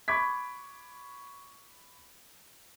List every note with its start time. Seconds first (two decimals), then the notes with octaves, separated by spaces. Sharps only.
0.08 B5 C#6 D6 G#6 B6